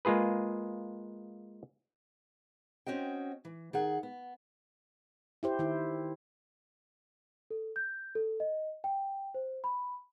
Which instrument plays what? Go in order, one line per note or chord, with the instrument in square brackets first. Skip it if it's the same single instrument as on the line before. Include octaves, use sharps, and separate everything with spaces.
[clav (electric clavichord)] G#3 A#3 F4 G#4 B4
[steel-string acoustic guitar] C4 C#4 F#4 D#5 G5
E3
D#3 G#4 F#5
B3
[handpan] E4 G4 C5
D#3 E4
[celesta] A4
G6
A4
D#5
G5
C5
B5